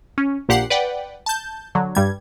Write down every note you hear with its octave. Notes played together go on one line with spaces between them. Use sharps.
C#4
A#1 A#2 G4 F#5 C7
B4 D5 F#5 G5
A5 G6
D3 F#3
G2 G3 G#6